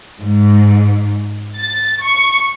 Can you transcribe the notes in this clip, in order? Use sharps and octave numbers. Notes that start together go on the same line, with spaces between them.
G#2
A6
C#6